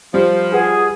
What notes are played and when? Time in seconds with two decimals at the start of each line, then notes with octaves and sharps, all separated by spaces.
0.14 F3 G3
0.52 F4 G#4 B4 F#5